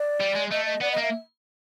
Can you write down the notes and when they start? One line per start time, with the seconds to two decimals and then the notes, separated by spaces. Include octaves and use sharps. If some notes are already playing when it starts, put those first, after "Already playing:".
Already playing: D5
0.20 G3
0.36 G#3
0.52 A3 D#5
0.66 D#5
0.81 B3 D5
0.92 D#5
0.97 A#3 E5